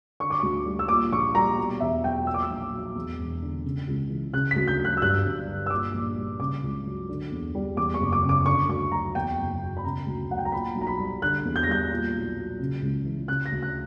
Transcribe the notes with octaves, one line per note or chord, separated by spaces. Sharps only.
D3 C#6
D6
D2 C#6
G3
E6
A#2 D6
A#1 C#6
G3 A#5
B2
E2 E5
F#3 G5
A#2 E6
D6
E6
A#1
F#3
E2
E1
D3
C#3
C#2
E3
C#3 F#6
D2 B6
G6
F#3
F#6
E6
G2 F#6
G1
D3
E6
A#2 D6
A#1
G3
C#3 D6
C#2
F#3
D3
E2
G3
E2 D6
C#6
F#1
D6
C#3
D6
D3 C#6
D2 C#6
F#3 A#5
E2 G5
F#1
B2
B5
C#3 A#5
D2
F#3 F#5
G5
A#5
A#2 B5
B1
A#5
B5
G3
D3 F#6
E2
G6
A#6
G3 G6
A#2
B1
F#3
C#3
C#2
E3
C#3 F#6
A#6
D2
F#6